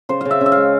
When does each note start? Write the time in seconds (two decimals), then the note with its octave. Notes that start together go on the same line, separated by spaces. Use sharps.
0.09 C#3 C5
0.21 C#3 F5
0.31 E5
0.41 C#3
0.46 E5
0.52 G#3 F5